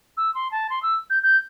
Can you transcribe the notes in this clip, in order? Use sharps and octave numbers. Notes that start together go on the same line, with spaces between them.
E6
C6
A5
C6
E6
G6
G6